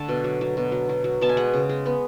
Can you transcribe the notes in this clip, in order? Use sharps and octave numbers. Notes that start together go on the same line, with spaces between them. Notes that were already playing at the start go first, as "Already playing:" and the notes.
Already playing: D3 A3 A5
B2
F#3
F#3
B2
F#3
F#3
F#3
B2 A5
G#5
G#3 F#5
C#3
G#3
B3